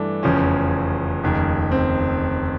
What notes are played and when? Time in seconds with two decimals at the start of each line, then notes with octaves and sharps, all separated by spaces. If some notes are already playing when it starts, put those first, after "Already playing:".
Already playing: G2 E3 A3 D4
0.23 F1 E2 C#3 F3 C#4
1.23 F1 D#2 C#3
1.72 C4